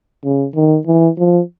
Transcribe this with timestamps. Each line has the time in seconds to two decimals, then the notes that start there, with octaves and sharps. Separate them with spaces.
0.24 C#3
0.55 D#3
0.87 E3
1.19 F3